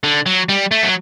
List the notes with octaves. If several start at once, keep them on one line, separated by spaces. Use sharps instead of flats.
D3
F#3
G3
A3
F#3